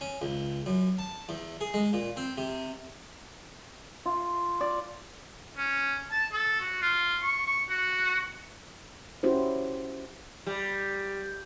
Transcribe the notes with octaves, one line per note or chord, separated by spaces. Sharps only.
C#4
C#2
F#2
A5
E2
G#4
G#3
A#2
C4
C3
F4
D5
C#4
A5
A4
F#4
F4
C#6
C#6
F#4
C#4 E4 F#4 G4 C5
G3